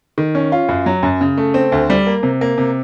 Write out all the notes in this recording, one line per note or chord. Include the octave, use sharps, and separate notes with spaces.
D#3
C#4
F4
F#2
F#3
F#2
C#3
A3
C4
D2
G3
A#3
C3
A#3
C3